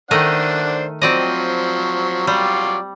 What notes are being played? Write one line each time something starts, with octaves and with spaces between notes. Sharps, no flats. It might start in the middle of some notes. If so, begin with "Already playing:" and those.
D#3 A3 D4 C5 D#5 F#5
F3 F#3 C4 D5 D#5
F#3 G3 F4 D5